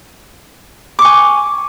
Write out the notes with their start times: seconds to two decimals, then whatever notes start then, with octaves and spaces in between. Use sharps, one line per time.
0.99 D6
1.02 C#6
1.05 G#5